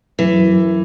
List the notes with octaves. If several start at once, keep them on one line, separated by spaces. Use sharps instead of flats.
F#2 E3
F#2
F#2